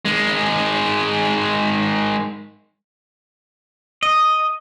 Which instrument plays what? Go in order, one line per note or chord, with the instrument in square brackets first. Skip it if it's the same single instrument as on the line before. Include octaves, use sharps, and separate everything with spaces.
[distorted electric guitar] D#3 G#3
[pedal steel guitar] D#5